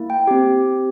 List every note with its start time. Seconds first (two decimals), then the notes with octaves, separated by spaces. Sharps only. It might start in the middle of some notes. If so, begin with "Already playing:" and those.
Already playing: A#3 E4
0.10 G5
0.27 C4 G4